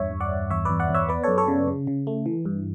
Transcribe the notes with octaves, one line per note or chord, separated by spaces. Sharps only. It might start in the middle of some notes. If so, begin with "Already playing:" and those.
Already playing: E2 G2 C#5 E5
G2
D5 F#5
G2
E2 C#5 E5
E2 B4 D5
D5 F#5
E2
C#5 E5
B3 B4 D5
F#2 A4 C#5
A4 C#5
C#3
C#3
C#3
A3
E3
G2